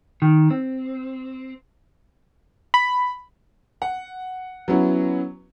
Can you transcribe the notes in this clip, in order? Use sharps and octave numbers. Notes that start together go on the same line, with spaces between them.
D#3
C4
B5
F#5
F#3 B3 C#4 E4